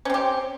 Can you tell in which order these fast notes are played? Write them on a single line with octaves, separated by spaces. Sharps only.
C#4 C4 G4